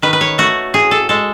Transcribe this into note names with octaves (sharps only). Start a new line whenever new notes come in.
D#3 B4
B4
C#5
A3 F#4
A2 G#4
A4
G#3 A4